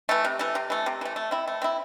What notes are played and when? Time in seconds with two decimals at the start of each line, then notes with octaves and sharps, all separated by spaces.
0.09 E3 A3
0.25 C3
0.39 E3 A3
0.55 C3
0.70 E3 A3
0.86 C3
1.01 E3 A3
1.16 A3
1.31 C4 E4
1.48 A3
1.62 C4 E4